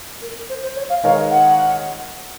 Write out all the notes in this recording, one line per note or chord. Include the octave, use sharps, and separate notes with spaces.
A#4
C5
C5
C#5
F5
D#3 G#3 D#4 A#4 C#5 F5
F#5